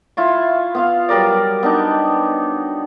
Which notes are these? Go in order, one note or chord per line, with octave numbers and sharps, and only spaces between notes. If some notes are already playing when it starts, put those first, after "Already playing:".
E4 F4 C#6
B3 F4 F5
F#3 G3 A#4 D5
B3 D4 D#4